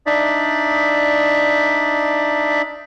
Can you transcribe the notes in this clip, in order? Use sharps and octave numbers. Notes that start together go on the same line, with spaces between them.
D4 D#4 D5 E5